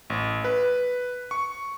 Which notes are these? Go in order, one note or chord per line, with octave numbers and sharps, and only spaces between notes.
A1
B4
C#6